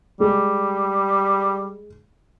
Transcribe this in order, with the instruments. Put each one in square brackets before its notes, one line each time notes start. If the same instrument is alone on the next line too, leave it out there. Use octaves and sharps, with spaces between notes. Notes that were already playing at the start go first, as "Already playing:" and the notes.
[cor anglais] G3 [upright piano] G#3 G#4